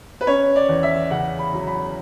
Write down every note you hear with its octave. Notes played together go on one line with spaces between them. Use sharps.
B4
C#4 C#5
D5
E2
E5
C#3 F#5
B5
F#3
B5